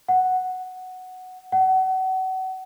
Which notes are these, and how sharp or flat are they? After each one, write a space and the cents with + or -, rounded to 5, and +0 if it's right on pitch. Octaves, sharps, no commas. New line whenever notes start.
F#5 +0
F#5 +30